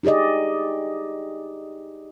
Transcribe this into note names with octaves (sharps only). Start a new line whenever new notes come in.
D#4 G4 G#4 D5 D#5